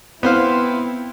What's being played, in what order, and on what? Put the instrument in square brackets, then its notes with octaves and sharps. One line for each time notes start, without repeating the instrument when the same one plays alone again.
[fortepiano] B3 C5 F5 [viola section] C4 E4